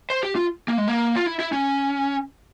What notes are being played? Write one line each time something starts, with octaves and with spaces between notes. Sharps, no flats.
C5
G4
F4
A#3
G#3
A#3
F4
E4
E4
C#4